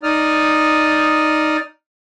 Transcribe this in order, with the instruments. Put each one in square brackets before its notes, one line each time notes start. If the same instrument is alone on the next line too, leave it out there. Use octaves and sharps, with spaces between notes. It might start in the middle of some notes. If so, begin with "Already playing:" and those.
[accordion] D#4 D5 D#6 F6